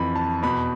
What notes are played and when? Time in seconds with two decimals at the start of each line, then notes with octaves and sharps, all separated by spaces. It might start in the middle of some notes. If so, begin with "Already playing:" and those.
Already playing: F2 E3 B5
0.15 A5
0.43 E2 B2 B5